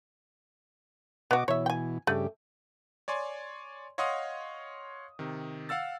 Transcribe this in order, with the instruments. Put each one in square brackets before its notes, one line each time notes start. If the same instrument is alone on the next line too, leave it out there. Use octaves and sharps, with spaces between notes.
[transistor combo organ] B2 D#5 D6 [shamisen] B3 F#4
[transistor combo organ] B2 E3 [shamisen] C#5 E5
[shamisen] G5 G#5
[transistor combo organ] G2 C#3 G4 [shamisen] A3
[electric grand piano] C#5 D5 G#5 C6
C#5 D#5 F5 F#5 C6 D#6
C3 D#3
F5 F#5 E6 A6